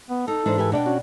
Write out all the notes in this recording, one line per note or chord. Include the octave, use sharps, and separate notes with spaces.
B3
D#4 A4
G#2 E3 D4 D#4 C5
G4 B4 G#5
B2 D4 D5 G5
C#4 F#4